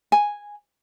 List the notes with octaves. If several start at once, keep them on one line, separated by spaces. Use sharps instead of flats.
G#5